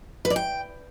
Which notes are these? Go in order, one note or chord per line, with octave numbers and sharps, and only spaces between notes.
B4
D5
G5